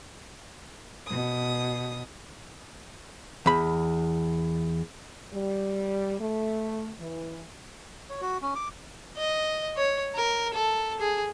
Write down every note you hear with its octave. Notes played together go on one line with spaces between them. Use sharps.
B2 D#6
E2 B5
G3
A3
E3
C#5
F#4
C#4
D6
D#5
C#5
A#4
A4
G#4